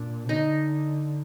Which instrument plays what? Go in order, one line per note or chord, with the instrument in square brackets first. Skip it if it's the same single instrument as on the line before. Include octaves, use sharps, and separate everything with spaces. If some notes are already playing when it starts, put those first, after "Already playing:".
Already playing: [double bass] A#2 [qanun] D4
[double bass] D3 [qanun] D#4